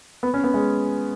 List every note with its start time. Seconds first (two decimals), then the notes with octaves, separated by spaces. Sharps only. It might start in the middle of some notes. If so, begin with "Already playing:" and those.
0.23 B3
0.34 C#4
0.44 B3
0.54 G#3